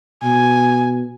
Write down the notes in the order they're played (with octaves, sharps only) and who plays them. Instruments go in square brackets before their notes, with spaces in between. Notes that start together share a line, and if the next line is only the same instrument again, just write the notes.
[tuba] B2 [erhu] G#5